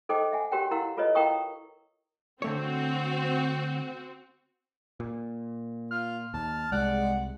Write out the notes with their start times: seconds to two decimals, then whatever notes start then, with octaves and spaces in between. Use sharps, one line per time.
0.09 D#4 A4 C5 D#5 G5 D6
0.32 E5 F#5 G#5
0.52 F#4 G4 A#4 C#5 F#5 G5
0.71 E4 A#4 F5 F#5 E6
0.97 F4 A4 B4 C#5 D#5
1.15 E4 A#4 F5 G5 C#6 D#6
2.42 D3 A3 C4 F#4 C#5
5.00 A#2
5.91 F4 F6
6.34 D#2 A5
6.72 C2 G#3 D5 F#5